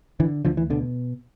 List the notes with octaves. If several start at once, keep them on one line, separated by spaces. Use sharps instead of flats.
D3 E3
D2 D3 F3
E3
B2 D3